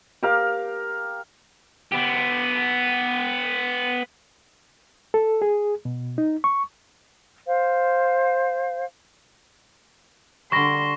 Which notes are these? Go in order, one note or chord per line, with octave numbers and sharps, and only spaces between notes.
G4 A#4 F5
B3 G4
A4
G#4
B2
D#4
C#6
C5 F5
D3 G3 C6 C#6 A#6